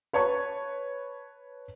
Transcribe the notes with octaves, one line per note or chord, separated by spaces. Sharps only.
B4 C#5 A5 C#6